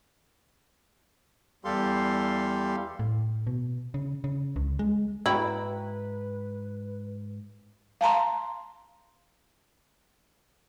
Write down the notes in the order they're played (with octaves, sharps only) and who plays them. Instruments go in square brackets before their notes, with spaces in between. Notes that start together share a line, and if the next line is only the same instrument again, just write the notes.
[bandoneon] E2 G3 G4 A4 F5 C6
[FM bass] A2
B2
C#3
C#3
C#2
G#3
[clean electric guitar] G#2 A#5 [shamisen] E4 [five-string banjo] F#4 G5 B5 [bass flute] B4
[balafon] F5 A5 A#5 C6